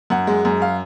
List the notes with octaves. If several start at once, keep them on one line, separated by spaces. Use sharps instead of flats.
F#2 F#5
G#3
F#2
F5